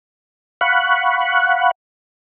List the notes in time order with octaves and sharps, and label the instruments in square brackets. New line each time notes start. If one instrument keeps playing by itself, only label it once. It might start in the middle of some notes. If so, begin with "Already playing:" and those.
[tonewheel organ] F5 F#5 B5 C#6 F#6